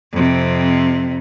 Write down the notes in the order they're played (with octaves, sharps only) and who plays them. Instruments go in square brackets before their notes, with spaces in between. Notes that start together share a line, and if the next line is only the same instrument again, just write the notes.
[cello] F2 C3